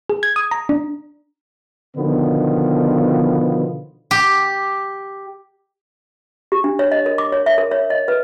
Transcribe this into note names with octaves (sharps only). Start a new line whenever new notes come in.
G#4
G#6
D#6
A#5
D4
B2 D3 D#3 F3 B3
G4
G4
D4
C#5
D#5
A#4
D6
C#5
E5
A#4
C#5
D#5
B4